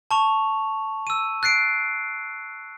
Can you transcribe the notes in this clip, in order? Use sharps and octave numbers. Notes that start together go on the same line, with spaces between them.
A5 C#6 F7
E6 D#7
F#6 A6 C7 D7